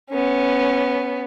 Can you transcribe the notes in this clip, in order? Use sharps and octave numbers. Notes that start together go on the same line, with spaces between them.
B3 C#4